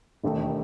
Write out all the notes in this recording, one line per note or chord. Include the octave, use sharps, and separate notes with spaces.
E1 D#2 D#3 A3